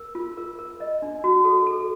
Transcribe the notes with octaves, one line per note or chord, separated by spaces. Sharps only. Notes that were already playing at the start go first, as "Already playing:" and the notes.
Already playing: A#4
F4
A#4
A#4
D#5
D4
F#4
A4
A4